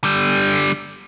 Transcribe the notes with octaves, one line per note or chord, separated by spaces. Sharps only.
D3 G3